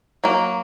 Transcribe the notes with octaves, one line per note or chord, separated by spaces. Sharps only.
F#3 A#3